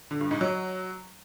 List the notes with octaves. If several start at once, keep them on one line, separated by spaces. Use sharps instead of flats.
D3
G2
G#2
F#3